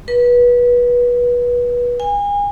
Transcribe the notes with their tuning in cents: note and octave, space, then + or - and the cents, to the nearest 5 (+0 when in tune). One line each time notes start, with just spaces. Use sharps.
B4 -25
G#5 -35